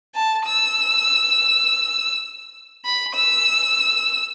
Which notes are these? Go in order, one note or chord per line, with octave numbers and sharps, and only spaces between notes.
A5
E6
B5
E6